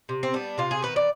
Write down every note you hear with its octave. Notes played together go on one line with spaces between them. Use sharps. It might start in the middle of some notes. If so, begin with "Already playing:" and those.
C3
C4
G3 B3 D4
C3 F4
G#4
D#3 B3 B4
D5